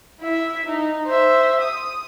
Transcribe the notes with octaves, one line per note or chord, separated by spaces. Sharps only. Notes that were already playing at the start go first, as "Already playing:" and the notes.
E4 E5
D#4
C5 E5
D#6